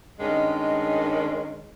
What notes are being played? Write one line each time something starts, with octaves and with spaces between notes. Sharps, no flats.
G2 D#3 G#3 C#4